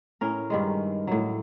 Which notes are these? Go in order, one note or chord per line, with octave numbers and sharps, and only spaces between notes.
A2 C#4 A#4
G2 D#3 G#3
A2 F#3